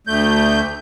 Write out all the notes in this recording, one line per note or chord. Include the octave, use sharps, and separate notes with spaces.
D2 A3 G6